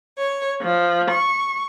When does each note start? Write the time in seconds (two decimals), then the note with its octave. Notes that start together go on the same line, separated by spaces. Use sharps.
0.17 C#5
0.63 F3
1.11 C#6